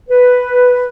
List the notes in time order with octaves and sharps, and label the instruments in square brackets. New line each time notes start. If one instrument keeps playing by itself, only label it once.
[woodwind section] B4